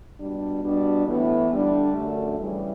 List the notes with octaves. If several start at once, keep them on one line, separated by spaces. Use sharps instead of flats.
B2 G3 D4
B2 G3 D4
A2 E3 B3
D3 G3 D4
F#2 D3 A3
C#3 E3 G3